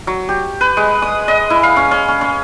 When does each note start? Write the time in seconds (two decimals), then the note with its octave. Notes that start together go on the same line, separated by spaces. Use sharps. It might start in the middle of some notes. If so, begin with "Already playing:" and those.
0.07 F#3
0.29 G4
0.61 B4
0.77 G#3
1.02 D#6
1.28 D#5
1.50 E4
1.63 F5
1.76 C#4
1.91 C#4
2.08 C#4
2.21 C#4